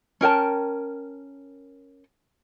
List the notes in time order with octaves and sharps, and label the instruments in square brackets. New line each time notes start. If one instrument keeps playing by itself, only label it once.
[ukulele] C#4 A#4 G5 A5